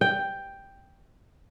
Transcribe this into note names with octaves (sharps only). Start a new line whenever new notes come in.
G5